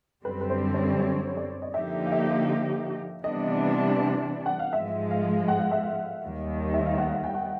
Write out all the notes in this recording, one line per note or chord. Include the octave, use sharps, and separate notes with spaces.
F#2 D3 G3 C4 B4
B4
C5
C#5
C#5
D5
D#5
D3 F3 A#3 D#4 G4 E5
F5
E5
C3 E3 G3 B3 D4 D#5
F#5
F5
G#2 F3 G#3 E5
F5
F#5
F5
E5
F5
D#2 D#3 G3
E5
F5
F#5
G5
F#5